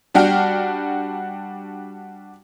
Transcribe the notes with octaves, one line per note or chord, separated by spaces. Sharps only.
G3 D4 F#4 G5 F6